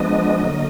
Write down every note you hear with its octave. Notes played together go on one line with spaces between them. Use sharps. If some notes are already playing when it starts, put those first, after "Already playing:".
Already playing: F3 G#3 B3 D4 D#5
D3 F#3 A#3